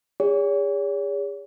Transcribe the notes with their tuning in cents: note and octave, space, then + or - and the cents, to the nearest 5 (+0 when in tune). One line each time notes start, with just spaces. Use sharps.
G#4 -40 C#5 +40